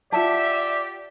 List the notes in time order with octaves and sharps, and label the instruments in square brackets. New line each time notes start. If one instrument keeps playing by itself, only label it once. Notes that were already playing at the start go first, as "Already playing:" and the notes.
[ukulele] F4 F#5 A5 [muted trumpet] G4 [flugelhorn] D5 [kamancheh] E5